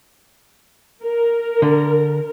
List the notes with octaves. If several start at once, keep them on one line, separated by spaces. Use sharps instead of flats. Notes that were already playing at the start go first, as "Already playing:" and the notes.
A#4
D3